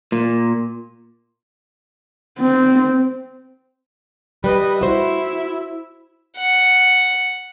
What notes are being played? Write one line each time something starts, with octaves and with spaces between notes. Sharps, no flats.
A#2
C4
G3 B4 D#5
E4 F#4 C5 E5
F#5